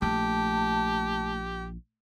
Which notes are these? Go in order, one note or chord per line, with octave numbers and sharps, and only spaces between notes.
A#1 A3 G4 A5